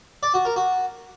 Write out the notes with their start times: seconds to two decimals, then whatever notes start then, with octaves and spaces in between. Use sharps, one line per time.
0.23 D5
0.34 F#4
0.45 A#4
0.56 F#4